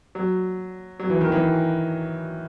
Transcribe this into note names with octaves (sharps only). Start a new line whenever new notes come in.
F#3
F#3
E3
D#3
E3